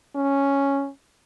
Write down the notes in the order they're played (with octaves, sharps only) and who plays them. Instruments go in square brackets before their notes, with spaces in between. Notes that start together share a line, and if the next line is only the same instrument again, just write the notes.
[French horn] C#4